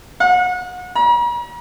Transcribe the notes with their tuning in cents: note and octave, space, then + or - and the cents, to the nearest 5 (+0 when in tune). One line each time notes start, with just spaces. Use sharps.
F#5 -35
A#5 +45